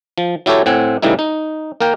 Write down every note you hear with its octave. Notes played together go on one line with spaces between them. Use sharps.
F3
F#3 E4 G4 A4 C#5
A2 C4 F#5 G#5
A2 C#3 E3 G3 D#4 E4
D#4
A#3 A#4 G5